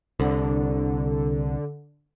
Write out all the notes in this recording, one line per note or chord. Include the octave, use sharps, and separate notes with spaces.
C2 D3